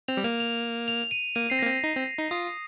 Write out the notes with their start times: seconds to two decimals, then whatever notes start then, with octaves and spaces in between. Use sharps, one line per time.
0.08 C4 F7
0.17 G3
0.24 A#3 F7
0.40 F7
0.88 F7
1.11 D#7
1.36 A#3 D#7
1.50 C4 C7
1.59 A#3 A#6
1.67 C4
1.84 D#4
1.95 C4
2.19 D#4
2.31 F4 D#6